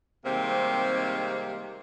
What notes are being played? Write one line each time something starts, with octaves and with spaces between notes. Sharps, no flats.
C3 D#3 G3 G#3 A#3 C4